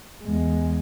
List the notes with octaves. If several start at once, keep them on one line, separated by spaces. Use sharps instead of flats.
E2 G#3